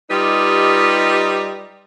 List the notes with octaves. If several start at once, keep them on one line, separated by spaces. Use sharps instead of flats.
G3 D#4 F4 G4 B4 D#5